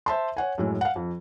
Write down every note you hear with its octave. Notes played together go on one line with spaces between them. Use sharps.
C5 E5 A5 C6
C#5 F#5 G#5
F#2 A2 G#3
F5 F#5
F2